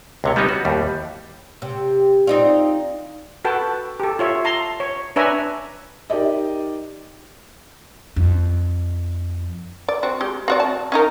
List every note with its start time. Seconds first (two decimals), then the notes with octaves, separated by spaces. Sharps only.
0.24 C#2 C3 C#5
0.36 G3 B3 C#4 D#4 B4 C#5
0.49 F#4
0.65 D#2 A2 G3
1.62 C3
2.27 C4 D#4 F4 D5
3.45 F#4 A4 B4 G5 A5
4.00 G4 A4
4.19 F4 C#5 E5
4.45 A5 A#5 C6
4.80 C#5
5.16 D4 B4 C#5 E5 G#5 A#5
6.10 D#4 G4 A#4 D5 D#5
8.16 F2
9.89 D5
10.03 C4 F#4
10.21 G#3 G4
10.48 C4 F#4 D5
10.60 A5
10.92 C#4 D#4 A#4